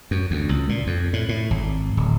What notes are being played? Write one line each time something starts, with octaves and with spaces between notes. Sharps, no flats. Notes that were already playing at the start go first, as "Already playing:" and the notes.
F#2
D2
C#2
A#2
F2
A2
A2
G#1
D1